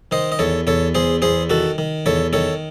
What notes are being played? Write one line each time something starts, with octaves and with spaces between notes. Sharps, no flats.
D#3 C5 D#5
D#5
E2 A4 C#5
E2 A4 C#5
E2 G#4 C5
E2 G#4 C5
D#3 F#4 A4
D#3
E2 A4 C#5
D#3 A4 C#5